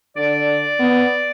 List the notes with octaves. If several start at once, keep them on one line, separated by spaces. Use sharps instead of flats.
D3 D5
B3